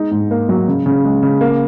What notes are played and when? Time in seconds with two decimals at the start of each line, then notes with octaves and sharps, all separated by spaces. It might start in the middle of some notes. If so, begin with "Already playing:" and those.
Already playing: G#3 D#4
0.11 G#2
0.31 A#3
0.49 F#3
0.68 C#3
0.86 C#3
1.05 G#3
1.23 C#3
1.41 A#3